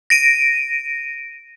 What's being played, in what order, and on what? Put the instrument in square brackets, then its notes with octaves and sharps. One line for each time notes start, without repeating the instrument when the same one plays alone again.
[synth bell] A#6 D7 D#7